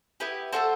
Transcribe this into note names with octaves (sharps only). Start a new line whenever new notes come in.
B3 E4 G4 B4
A3 D4 F#4 A4 C5